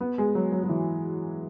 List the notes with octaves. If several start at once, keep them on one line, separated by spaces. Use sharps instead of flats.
B3
G#3
F#3
F#3
F#3
E3